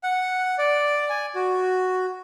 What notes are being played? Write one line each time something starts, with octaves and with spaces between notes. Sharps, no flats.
F#5
D5
G#5
F#4